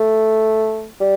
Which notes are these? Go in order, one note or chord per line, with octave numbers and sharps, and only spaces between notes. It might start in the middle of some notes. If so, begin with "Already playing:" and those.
Already playing: A3
G3